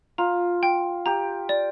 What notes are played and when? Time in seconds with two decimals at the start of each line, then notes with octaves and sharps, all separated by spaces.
0.18 F4 A#5
0.63 G5
1.06 G4 A#5
1.49 D5